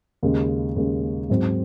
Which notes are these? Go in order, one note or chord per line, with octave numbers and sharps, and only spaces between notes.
D#2 C#3 G#3
D#2 C#3 G#3
G#2 F#3 C4